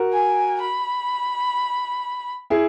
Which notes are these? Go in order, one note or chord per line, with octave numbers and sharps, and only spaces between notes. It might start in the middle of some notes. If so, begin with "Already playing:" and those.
Already playing: F#4 A#4
G#5
B5
E4 G#4